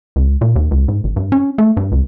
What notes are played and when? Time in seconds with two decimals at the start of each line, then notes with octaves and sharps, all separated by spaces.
0.16 C#2
0.41 A#2
0.56 D#2
0.71 C#2
0.88 G#2
1.04 G#1
1.16 G2
1.32 C#4
1.58 A3
1.77 G2
1.92 C#2